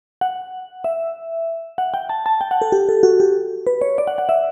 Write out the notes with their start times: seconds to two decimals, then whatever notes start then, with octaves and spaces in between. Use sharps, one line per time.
0.21 F#5
0.84 E5
1.78 F#5
1.94 G5
2.09 A5
2.26 A5
2.41 G5
2.51 F#5
2.62 A4
2.72 G4
2.89 A4
3.03 F#4
3.20 G4
3.67 B4
3.81 C#5
3.98 D5
4.07 F#5
4.18 F#5
4.29 E5